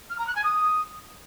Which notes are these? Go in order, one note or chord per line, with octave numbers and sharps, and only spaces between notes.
F6
A#5
F#6
G#5
D#6